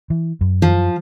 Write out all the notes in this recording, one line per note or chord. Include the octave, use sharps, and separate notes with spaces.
E3
F#2
F3